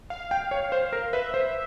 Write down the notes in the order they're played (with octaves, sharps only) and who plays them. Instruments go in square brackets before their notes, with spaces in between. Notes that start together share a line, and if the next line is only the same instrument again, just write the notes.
[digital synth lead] F5
[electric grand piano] G5
C#5
C5
A#4
[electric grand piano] B4 [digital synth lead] E5
[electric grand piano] C5